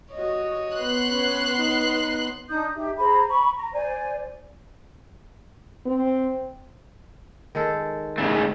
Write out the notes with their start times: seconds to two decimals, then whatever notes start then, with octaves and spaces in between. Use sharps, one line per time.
0.14 F#4 C#5 D#5
0.76 B3 C6 F#6
1.08 C#4
1.57 D#4
2.48 D4 D#4 D#6 G6
2.75 D#4 G4 E5
2.97 G#4 C5 A#5 B5
3.28 B5 C#6
3.55 A#5
3.73 C5 D5 G#5
5.86 C4
7.55 D#3 G#3 A4
8.18 G#2 C#3 A3